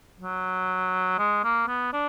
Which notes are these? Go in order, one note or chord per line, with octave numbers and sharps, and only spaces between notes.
F#3
G#3
A#3
B3
D4